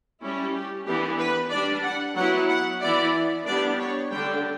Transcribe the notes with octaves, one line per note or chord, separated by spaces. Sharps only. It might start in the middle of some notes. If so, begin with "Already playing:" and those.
G3 C#4 E4
G4
E3 B3 D4 G4
B4
G3 D4 D5
F#5
F#3 B3 E4 F#5
F#5
E3 B3 E4 D5
G3 B3 D4 D5
C#5
D3 G3 D4 G5